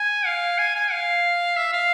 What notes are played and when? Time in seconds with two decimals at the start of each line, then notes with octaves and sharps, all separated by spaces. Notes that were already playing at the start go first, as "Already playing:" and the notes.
Already playing: G#5
0.26 F5
0.58 G#5
0.75 G#5
0.92 F5
1.56 E5
1.72 F5